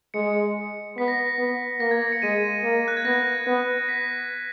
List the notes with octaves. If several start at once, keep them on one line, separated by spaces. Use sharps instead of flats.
G#3 C#7
B3 B6
A#6
B6
B3
A#3 A#6
G#6
A#6
C#7
G#3 D#7
A#3
F#6
G#6
B3 A#6
B3
B6